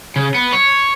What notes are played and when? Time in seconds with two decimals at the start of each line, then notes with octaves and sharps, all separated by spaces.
0.16 C#3
0.35 B3
0.53 C#5